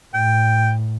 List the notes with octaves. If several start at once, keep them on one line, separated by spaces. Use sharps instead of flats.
A2 G5